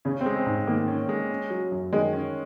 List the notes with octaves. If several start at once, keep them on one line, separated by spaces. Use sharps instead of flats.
C#3 C#4
C4
G#3
C4
G#2
D#3 A#3
C#4
G#3
C#4
F#3
F#2
D#3 G#3
C#4